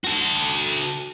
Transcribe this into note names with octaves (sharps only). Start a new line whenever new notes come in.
F#4 A4